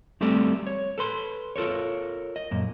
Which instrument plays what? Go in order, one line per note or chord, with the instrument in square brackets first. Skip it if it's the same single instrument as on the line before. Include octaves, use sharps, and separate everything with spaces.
[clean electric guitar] G3 A3 C4 G4 A4 D5
C#5
A4 B4 C6
F4 A4 A#4 C#5
D#5
F#2 A#2